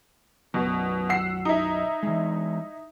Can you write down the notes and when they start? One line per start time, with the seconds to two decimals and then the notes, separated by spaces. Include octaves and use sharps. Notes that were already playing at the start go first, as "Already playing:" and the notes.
0.54 B1 F#2 B2 F#3
1.09 F#5 E6 C7
1.45 D#4 E4
2.03 E3 G#3